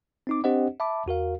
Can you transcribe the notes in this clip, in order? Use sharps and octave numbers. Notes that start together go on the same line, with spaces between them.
C4 D#4 D6
C4 D4 G4 C5 D#5 F#5
E5 A5 B5 D6
E2 F#4 A#4 F5